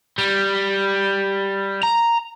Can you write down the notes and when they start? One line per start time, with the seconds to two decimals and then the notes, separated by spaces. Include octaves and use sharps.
0.18 G3
1.83 A#5